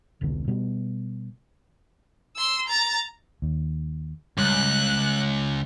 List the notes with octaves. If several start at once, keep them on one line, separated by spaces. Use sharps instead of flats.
E1 C2 B2 D3
B2 G3 B3
C6 E6
A#5 A6
D#2
C#2 G3 F#6